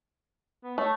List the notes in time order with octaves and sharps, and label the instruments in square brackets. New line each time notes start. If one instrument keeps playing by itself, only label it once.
[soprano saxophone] B3
[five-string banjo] A3 [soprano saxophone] C#5